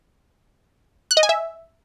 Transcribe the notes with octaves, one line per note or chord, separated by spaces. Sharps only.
F#6
D#5
G#5
E5